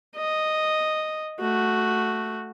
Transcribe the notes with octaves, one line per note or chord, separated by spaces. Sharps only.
D#5
A3 F#4